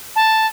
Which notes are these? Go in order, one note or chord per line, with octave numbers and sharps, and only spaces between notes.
A5